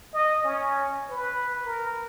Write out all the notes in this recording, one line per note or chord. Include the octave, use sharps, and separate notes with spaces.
D#5
C#4
B4
A#4